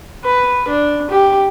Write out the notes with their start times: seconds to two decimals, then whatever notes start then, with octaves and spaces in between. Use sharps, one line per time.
0.24 B4
0.68 D4
1.10 G4